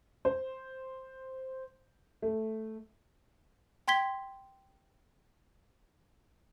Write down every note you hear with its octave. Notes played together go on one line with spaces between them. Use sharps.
C5
A3
G5 C6 G#6 B6 G7